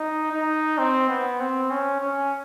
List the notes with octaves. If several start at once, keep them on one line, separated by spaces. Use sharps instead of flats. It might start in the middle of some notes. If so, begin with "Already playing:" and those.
Already playing: D#4
D#4
C4
B3
C4
C#4
C#4